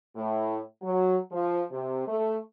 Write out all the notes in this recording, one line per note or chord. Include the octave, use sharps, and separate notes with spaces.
A2
F#3
F3
C3
A3